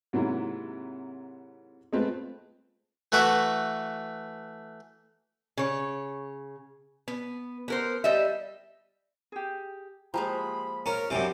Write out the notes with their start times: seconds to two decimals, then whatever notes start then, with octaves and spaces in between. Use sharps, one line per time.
0.13 G#2 C3 F#3 A#3 E4
1.93 G#3 A3 C4 F4 B4
3.12 E3 A3 F#4 B4 E5
5.57 C#3 C#5
7.08 B3
7.68 B3 A#4 C5
8.04 G3 D#5 E5
9.32 G4 G#4
10.14 F3 G#3 A#3 G4 A#5 B5
10.86 C#4 F4 A#4 A#5
11.10 F#2 C3 G3 D4 F#4 C5 G#5